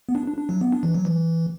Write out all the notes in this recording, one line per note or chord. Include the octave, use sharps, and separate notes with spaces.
B3
D4
D4
D4
F#3
B3
D4
E3
F#3
E3